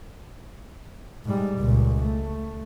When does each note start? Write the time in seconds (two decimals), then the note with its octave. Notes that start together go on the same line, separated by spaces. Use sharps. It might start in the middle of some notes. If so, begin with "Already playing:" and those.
1.25 G#2 G3
1.60 C#2 A#2
2.03 A3